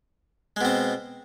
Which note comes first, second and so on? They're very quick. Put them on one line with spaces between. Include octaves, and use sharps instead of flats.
G#3 B2 C4